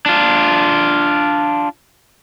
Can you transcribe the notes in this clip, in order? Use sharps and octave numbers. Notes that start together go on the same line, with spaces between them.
D4 F4